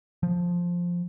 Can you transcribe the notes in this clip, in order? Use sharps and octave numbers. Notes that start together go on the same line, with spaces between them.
F3